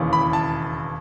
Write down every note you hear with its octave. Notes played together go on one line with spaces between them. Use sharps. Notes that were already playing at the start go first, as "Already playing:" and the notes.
Already playing: E1 D#2 C#3 E3
B5
A5